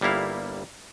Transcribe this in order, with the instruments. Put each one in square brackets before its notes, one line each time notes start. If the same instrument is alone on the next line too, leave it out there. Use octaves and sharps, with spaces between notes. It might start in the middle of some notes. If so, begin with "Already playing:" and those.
[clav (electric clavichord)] G1 G3 A#3 E4 F5